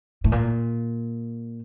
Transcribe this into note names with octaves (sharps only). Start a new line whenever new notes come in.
A2
A#2